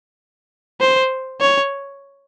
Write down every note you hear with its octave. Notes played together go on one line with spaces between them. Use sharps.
C5
C#5